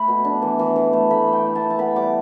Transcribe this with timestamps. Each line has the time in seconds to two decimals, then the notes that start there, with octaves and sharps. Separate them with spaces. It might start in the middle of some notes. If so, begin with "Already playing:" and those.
Already playing: A3 B5
0.08 B2
0.24 D4
0.42 E3
0.59 E3
0.76 E3
0.93 A3
1.11 A3 B5
1.28 A3
1.33 G5
1.45 E4
1.56 A5
1.63 E3
1.70 A5
1.79 B3 B5
1.96 G3 D6